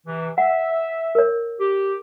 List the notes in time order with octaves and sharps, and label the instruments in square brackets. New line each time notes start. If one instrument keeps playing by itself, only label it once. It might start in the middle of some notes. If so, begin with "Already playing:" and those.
[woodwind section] C3 E3
[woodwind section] E5 [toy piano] F#5
[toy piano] A#4 C#5
[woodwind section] G4